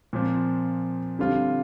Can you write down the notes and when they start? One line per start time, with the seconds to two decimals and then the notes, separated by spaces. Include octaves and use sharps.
0.13 A#2 F3 C4
1.19 D3 G3 C4 F4